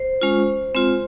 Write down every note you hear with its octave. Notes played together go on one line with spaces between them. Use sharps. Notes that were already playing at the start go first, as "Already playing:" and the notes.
Already playing: C5
G#3 C#4 F4
G#3 C4 F4